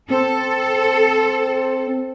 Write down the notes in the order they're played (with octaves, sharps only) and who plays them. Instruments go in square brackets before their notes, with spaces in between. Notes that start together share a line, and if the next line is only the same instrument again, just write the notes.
[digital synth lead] C4 [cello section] A4